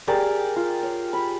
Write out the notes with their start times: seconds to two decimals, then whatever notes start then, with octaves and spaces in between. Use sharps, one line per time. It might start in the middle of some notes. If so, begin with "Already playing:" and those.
0.08 G4 G#4 A#4 D5
0.56 F4
0.83 C#5
1.13 B5